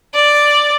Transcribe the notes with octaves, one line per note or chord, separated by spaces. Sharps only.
D5